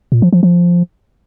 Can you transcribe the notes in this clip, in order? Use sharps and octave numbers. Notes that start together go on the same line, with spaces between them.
A#2
F3
F3
F3